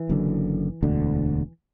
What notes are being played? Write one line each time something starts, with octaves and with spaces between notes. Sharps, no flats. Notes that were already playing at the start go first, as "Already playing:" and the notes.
Already playing: E3
F#1 F#2 D3
E1 D2 D3